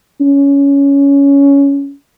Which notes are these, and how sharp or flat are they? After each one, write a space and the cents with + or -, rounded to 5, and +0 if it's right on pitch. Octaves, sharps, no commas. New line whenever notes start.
C#4 +15